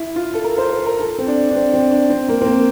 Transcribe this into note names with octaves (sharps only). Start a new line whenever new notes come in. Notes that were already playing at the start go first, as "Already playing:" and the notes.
Already playing: E4
F4
A4
A#4
C5
C5
A#4
A4
C4
D4
D4
C4
C4
D4
C4
A#3
C4
A#3